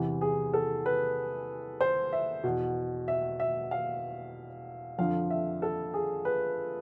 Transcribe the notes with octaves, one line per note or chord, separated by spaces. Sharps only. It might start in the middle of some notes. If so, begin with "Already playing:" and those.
Already playing: E2 C3 E3
G#4
A4
B4
C5
E5
E2 B2
E5
E5
F5
F2 D3 F3 F5
E5
A4
G#4
B4